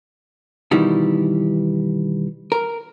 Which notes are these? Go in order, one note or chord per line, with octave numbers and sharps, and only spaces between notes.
B2 D#3 E3 G3 D#4 E4
A#4